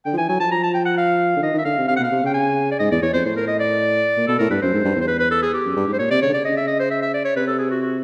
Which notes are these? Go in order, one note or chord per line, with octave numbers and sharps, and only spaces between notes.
D3 G5
F3
E3 G#5
F#3 G#5
F3 A5
F3 A#5
A5
G5
F#5
F5
D3
D#3 D#5
D#3 E5
D3 F5
C3
C3 F5
F#5
B2 F5
C3
C#3 G5
G#5
D5
G#2 D#5
E2 D5
E2 C#5
F2 C5
A2 C5
A#4
D#5
D5
A#2
B2 A4
A2 A#4
G2 B4
F#2 C5
G#2
G2
E2 C5
B4
B4
A4
G#4
G4
F#2
G2
G#2
C5
A#2 C#5
C3 D5
C#3 C#5
D3
C#3 D5
D#5
E5
D#5
C5
E5
E5
D5
C#5
C3 B4
A4
G#4
F#4
F#4